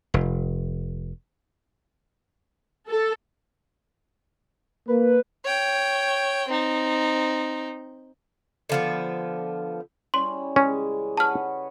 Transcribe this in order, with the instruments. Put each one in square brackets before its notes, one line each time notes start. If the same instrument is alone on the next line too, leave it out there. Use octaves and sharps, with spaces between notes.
[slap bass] F1
[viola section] A4
[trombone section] A#3 [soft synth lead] B4
[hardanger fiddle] C#5 G5
C4 D#4
[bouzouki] D3 F3 B3
[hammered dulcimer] G3 C#4 E4 [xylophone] C6
[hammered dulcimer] C#3 E3 G#3 [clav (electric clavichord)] C#4
[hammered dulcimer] F#4 B4 C#5 [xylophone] A5 F6